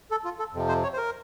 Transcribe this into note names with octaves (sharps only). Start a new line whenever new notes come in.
A4
F4
A4
F2 C3 F3
C5
C#5
C5
A#4